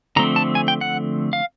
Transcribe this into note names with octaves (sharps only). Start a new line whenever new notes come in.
D3 F3 A3 C4 A#5
A5
G#5
G5
F#5
F5